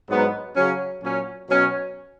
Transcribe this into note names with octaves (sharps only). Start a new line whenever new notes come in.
G#2 F#3 B3 D#4
C#3 F#3 C#4
A#2 F#3 C#4
B2 F#3 C#4